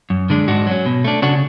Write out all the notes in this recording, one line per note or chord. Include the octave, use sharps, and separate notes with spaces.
F#2
D3 G#3 D4
G#2 D4 F#4
F#3 C#4
B2
A3 D4
C#3 D4 F#4